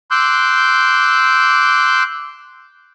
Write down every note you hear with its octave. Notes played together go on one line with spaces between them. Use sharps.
C6 D6 E6 F#6 G6